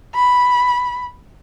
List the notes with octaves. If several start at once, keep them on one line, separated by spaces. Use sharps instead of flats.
B5